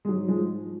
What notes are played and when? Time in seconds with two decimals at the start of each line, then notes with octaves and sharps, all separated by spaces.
0.05 G#3
0.08 G#2 F#3
0.28 F3 G#3